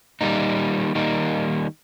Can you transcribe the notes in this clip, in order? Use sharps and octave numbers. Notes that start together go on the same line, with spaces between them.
D#3 G3 A#3 D#4
D#3 G3 A#3 D#4